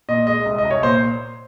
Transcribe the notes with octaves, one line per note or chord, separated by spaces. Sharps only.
A#2 D#5
G#3 D#5
C2
D#5
C2
C#5
A#2 C5